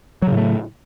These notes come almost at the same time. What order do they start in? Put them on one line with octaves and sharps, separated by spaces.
F#3 C#3 A2 A3